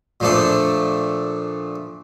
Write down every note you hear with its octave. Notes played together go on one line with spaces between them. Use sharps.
A#2 F3 A3 D4 A4